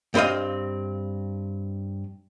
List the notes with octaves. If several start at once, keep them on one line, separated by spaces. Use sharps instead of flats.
G2 C4 B4 D#5 F5